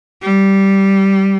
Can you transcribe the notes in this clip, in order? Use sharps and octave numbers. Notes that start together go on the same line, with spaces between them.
G3